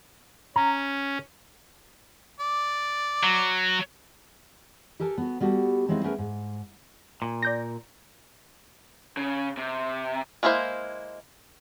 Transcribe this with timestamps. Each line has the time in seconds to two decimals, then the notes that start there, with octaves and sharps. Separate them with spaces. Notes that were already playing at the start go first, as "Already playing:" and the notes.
0.56 C#4 A#5
2.40 D5
3.23 F#3
5.00 G4 A4 A#4 G#5 A5
5.18 B3 F#4
5.40 G3 B3 F#4 G4 A4
5.88 F#3 G#3 A#3 C4 D#4 E4
6.03 A3 B3 C#4 G#4 A#4 B4
6.18 G#2
7.22 A#2
7.43 D5 G6 A#6
9.17 C#3
9.57 C3
10.43 G#3 A#3 E4 A4 C5